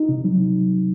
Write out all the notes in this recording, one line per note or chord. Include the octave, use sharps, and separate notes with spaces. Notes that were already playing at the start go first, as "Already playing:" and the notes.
Already playing: D#4
C3
F#3